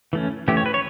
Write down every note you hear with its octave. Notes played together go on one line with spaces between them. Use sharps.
E3 A3 C#4
E3 A3 C#4 G4
C#5
B4
C#5